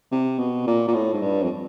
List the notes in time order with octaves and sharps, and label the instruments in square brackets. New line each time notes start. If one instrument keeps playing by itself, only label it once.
[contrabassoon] C3
B2
A#2
A#2
A2
G#2
G2
F2